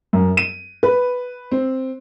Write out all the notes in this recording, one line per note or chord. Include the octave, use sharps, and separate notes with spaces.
F#2
D#7
B4
C4